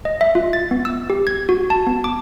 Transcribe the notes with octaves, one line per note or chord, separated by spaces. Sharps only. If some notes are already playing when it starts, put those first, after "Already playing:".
D#5
E5
F4
A6
B3
E6
G4
G#6
F#4
A5
B3
D6